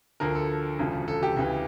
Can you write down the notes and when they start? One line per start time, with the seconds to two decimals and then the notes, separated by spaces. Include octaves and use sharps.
0.20 D2 D3 F3 A#4
0.35 A4
0.79 E1 D2 C#3 F3
1.08 A4
1.23 G4
1.36 D2 C#3 E3